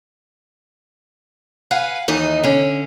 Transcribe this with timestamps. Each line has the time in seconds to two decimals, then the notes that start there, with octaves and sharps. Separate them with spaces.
1.71 B4 F5 F#5 G#5
2.08 D#2 E3 D#4 D#5
2.43 D3 C#4